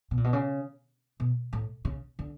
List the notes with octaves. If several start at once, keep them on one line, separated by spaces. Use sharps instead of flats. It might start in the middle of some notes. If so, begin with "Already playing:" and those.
B2
A#2
B2
C#3
B2
A2
C#3
D3